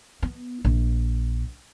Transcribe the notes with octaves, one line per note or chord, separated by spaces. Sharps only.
B3
A#1